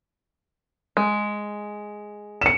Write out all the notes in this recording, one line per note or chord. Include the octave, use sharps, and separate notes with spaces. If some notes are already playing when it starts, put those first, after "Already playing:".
G#3
C#7 E7